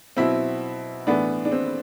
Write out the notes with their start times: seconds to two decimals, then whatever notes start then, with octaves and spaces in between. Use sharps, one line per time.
0.17 B2 F#3 C4 E4
1.07 A2 E3 B3 D4
1.45 D4
1.52 C4